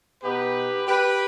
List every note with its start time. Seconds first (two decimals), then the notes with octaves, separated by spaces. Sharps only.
0.23 B2 B3 D#4 G4 B4
0.87 G4 B4